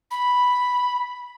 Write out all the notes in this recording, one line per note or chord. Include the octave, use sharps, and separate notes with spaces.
B5